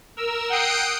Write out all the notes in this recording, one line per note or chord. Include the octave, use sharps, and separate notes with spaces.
A#4 E6
F#5 G5 D#6 C7 D7